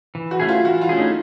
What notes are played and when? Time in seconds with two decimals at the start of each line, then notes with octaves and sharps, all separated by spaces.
0.15 E3
0.31 F#4
0.40 A3 C#4 E4 G#4
0.49 F4
0.64 E3 F#4
0.81 F4
0.89 A3 C#4 E4 G#4
0.98 D#4